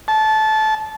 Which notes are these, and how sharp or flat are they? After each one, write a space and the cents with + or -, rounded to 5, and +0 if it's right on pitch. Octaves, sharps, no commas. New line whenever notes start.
A5 -20